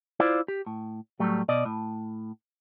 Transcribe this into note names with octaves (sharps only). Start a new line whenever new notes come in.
E4 F4 C5 D5
G4
A2
A2 F#3 G3 A3
B2 D5 D#5
A2